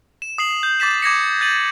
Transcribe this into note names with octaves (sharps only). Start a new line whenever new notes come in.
E7
D#6 C7 F#7
G6
D6 A6 B6 E7
D6 G#6 A#6 C#7
G6 A6 D#7 F#7